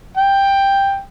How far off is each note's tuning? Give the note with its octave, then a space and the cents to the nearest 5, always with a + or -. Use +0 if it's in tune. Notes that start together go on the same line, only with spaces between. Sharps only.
G5 +10